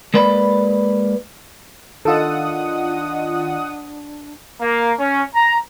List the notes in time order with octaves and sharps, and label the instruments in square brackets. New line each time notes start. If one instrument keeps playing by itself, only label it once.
[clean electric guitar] G#3 A#3 B4 D5 B5
[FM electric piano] D#3 F4 D#5 [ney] D4 [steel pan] A4 [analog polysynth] F#5 D#6
[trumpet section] A#3
C#4
A#5